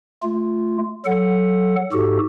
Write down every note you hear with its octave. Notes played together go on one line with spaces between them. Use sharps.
A3 F4
F#3 A4 F#5
G#2 F#4 G4 A4